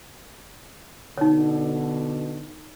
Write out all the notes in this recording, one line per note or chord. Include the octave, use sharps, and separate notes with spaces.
B2 D3 D#4 C#5